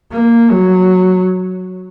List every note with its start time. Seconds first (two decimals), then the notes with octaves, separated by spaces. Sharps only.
0.11 A#3
0.50 F#3